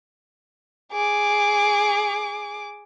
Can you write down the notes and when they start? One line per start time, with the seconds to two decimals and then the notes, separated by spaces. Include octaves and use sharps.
0.92 G#4 D6